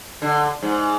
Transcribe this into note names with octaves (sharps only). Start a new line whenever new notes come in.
D3
G#2